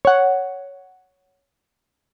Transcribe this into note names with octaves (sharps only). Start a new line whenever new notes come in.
C#5 F#5